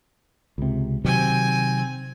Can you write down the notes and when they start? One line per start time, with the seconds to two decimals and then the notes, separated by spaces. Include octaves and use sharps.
0.58 C#2 C3
1.05 C3 D#3 F#3 C4 G#5